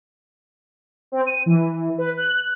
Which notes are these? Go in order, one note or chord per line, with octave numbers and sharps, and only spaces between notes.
C4
D#7
E3
B4
F#6